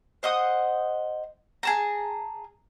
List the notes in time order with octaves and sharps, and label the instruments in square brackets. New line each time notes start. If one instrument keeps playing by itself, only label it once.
[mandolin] C5 D#5 F#5 D#6
G#4 A5 A#5